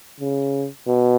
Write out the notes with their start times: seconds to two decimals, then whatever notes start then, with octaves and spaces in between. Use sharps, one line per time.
0.20 C#3
0.88 B2